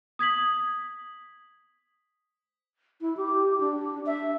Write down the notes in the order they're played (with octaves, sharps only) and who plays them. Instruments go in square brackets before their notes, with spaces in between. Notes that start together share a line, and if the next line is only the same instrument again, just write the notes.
[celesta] D#6 G#6 B6 F#7
[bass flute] E4
G4
D4
E5